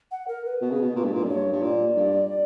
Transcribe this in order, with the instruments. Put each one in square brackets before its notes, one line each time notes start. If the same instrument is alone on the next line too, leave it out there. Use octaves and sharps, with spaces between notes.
[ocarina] F#5
A#4
B4
[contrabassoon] B2
C#3
B2
A#2
G2
A#2
[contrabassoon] F#2 [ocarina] D5
[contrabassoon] G2 [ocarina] C#5
[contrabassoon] G2
[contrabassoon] A#2 [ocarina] D5
[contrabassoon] G2